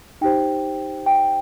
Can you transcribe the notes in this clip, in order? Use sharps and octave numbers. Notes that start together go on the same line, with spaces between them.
D#4 G4 C5 G5
G5